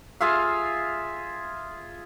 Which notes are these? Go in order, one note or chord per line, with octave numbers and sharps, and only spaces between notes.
F4 G#4 E5 F5